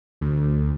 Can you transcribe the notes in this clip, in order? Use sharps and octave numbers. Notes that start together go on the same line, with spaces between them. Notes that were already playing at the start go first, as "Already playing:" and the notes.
D2